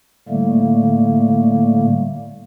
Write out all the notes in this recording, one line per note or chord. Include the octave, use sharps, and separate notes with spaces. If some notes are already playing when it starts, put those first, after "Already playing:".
A2 D3 G3 A3 A#3